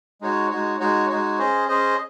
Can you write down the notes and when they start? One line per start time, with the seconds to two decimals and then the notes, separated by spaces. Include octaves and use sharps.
0.21 G#3 D#4 F#4 C#5
0.50 G#3 D#4 F#4 C#5
0.80 G#3 D#4 F#4 C#5
1.09 G#3 D#4 F#4 C#5
1.39 C#4 G#4 C5 D#5
1.68 C#4 G#4 C5 D#5